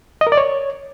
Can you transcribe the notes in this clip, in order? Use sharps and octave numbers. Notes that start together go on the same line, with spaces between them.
D#5
A#4
D5
C#5